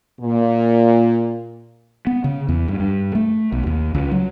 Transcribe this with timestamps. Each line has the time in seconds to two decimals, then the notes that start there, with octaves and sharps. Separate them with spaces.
0.21 A#2
2.07 B3
2.24 C#3
2.49 E2
2.68 G2
2.80 G2
3.15 A3
3.52 B1
3.67 D#2
3.94 C#2
4.12 F#3